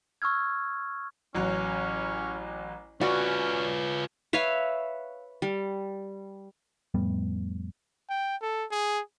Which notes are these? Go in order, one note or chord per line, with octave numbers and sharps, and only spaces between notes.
C#6 E6 F6 G#6
A1 F#3 C#4
C#4 F4 F#4 B4 D5
B4 C#5 E5 F5
G3
F2 A2 G3 B3
G5
A4
G#4